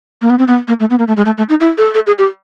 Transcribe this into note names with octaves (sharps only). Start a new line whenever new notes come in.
A#3
B3
C4
B3
A#3
A3
B3
A#3
A3
G#3
A3
A3
D#4
E4
A4
A4
G#4
G4